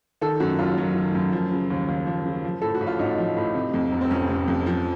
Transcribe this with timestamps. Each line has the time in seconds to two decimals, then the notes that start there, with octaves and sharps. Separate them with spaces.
0.21 D#3 A4
0.40 F#2 F#4
0.59 F#1 F4
0.78 F#3
0.95 D#3
1.15 F#2
1.32 F3
1.52 C#3
1.70 D#2
1.88 D#2
2.06 F3
2.25 C#3
2.44 F3
2.62 A2 A4
2.75 F#4
2.81 A1
2.87 F4
2.99 A1 D#4
3.18 F3
3.37 A2
3.55 C3
3.74 F2
3.92 F1
4.01 C4
4.11 F1 C#4
4.29 C3
4.48 F2
4.66 F3